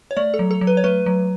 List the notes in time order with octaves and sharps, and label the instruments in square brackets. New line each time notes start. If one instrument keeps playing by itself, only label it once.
[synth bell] C#5
A3 D5
A4
F#3
A4
F#3
B4
C#5
A3 B4
F#3